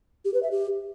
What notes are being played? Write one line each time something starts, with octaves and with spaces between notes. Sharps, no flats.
G4
B4
E5
G4